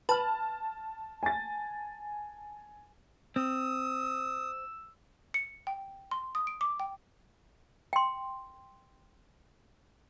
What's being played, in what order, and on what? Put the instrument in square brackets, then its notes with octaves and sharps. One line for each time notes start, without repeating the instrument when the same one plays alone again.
[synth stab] B4 [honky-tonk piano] A5 F6
[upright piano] G#5 A6
[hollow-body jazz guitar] C4 [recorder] D#6 [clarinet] E6
[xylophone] C#7
G5
C6
D#6
D7
D6
G5
[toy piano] G5 C6